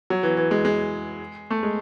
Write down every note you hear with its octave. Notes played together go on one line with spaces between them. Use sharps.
F#3
E3
E3
G#3
G#3
A3
G#3